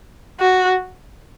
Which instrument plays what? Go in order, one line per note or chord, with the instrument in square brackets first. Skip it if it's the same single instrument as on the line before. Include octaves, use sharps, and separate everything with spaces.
[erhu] F#4